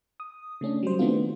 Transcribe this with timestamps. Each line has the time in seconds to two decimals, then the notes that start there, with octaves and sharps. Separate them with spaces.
0.20 D#6
0.61 C#3 A3 C#4 D4
0.83 F#3 G3 C5
0.99 D#3 A3 B3 C4 D4 F4